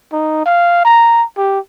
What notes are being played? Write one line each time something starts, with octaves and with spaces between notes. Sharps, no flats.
D#4
F5
A#5
G4